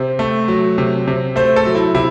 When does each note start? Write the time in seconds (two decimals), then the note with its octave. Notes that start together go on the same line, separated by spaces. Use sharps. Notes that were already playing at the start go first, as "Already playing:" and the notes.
Already playing: C3 C5
0.19 A3
0.48 F#3
0.78 C3
1.08 C3
1.36 A3 C5
1.56 A4
1.66 F#3
1.75 E4
1.94 C3 E4